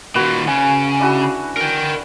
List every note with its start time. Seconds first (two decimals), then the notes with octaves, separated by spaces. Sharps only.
0.15 A#2 D#3 F#4 B4
0.47 C#3 G#5
1.00 D4 E4 F#4
1.57 A#4 G5